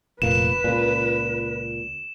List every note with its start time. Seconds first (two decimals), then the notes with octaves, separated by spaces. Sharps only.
0.22 F1 A#2 A#3 B4 E7
0.64 C#2 A#2